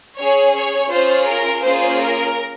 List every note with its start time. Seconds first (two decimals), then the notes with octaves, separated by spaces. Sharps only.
0.17 C#4 G#4 C#5
0.54 C#5
0.91 C#4 F4 G#4 C5
1.28 A#4
1.65 A#3 C#4 F4 G#4 C5
2.02 A#4